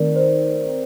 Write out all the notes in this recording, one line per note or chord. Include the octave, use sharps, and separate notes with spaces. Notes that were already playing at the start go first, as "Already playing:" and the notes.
Already playing: D#3 A3 C4 D#4 A#4 D5
C5